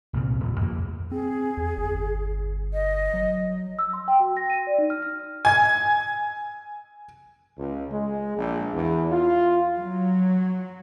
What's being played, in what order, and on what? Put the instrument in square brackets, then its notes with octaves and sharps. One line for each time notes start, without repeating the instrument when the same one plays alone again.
[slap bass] C2 A#2 C#3 C4
D#1
F2 A#3
[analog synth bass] C4 [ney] G#4
[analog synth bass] E2
G1
[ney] D#5
[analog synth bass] F#3
[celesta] E6
C6
G5
F#4
A#6
D#7
D5
D#4
F6
F6
[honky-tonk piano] G#5 G#6
[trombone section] C#2
G#3
A#1
E2
F4
[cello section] F#3